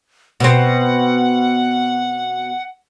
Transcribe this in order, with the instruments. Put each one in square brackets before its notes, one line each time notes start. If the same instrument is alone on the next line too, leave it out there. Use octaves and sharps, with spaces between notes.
[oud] B2 C4 [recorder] F#5